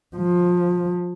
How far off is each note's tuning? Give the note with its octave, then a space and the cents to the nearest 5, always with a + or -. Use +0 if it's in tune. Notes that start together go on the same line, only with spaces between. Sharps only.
F3 +20